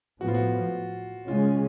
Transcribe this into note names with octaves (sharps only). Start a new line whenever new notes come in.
A2 F3 B3 F#4
F4
F#4
C#3 G#3 C#4 F4